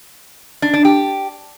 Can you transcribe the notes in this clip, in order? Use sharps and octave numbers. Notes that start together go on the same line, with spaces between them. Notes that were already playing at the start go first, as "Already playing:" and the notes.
D4
D4
G4